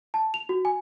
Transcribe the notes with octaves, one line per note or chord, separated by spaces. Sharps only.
A5
F7
F#4
G#5